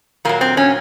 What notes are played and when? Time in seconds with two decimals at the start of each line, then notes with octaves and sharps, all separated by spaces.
0.25 A#2 F#3 A#3
0.41 C4
0.57 C#4